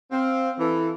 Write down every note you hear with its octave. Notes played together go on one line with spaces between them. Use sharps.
C4 F5
E3 A4